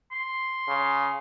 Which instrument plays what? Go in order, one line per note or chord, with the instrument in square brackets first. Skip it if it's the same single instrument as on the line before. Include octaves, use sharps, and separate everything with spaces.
[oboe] C6
[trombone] C#3